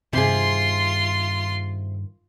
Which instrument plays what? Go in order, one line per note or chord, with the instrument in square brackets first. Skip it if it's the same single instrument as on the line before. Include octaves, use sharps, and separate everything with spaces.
[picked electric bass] G2 D#3 [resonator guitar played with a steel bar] C3 G#4 [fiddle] F4 C6